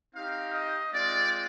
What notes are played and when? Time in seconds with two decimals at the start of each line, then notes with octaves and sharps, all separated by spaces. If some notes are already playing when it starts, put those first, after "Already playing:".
0.14 C4 D#4 G4 F5
0.53 D#5
0.93 G#3 C4 F4 D5